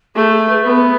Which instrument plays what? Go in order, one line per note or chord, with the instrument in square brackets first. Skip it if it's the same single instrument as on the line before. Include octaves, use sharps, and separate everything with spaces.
[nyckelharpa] A3 [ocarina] G#4
[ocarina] G#4
B4
[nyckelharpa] B3 [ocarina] B4